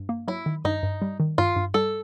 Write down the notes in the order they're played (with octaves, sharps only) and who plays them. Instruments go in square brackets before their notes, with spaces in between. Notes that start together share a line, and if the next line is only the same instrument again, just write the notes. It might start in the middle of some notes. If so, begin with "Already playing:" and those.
Already playing: [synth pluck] G2
A#3
[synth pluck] F#3 [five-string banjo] E4
[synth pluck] D#3
[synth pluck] G2 [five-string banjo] D#4
[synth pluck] G2
G3
D#3
[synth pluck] G2 [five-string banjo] F4
[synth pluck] G2
[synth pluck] G3 [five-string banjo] A4